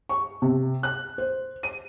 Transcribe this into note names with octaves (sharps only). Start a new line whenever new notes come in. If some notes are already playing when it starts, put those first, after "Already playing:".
C#6
C3
F#6
C5
D#7